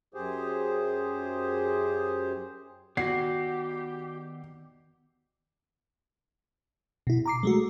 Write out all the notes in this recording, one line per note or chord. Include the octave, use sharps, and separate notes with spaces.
F#2 G4 G#4 C5
D#3 B3 F#4 G4 D5 F#5 C7
B2 E4
A#5 D6 C7
G#3 A3 F#4